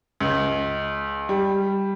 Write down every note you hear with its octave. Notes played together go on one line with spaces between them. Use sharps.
C#2
G3